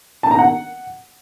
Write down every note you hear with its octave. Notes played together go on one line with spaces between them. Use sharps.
A5
A#5
F#5